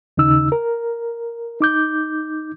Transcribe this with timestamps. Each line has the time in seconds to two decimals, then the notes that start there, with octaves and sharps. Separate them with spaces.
0.17 D#2 C#3 D#4 E6
0.52 A#4
1.60 D#4 D6 G6